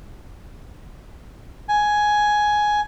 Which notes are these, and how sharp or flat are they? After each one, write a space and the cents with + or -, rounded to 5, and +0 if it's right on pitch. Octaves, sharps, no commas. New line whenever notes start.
G#5 +10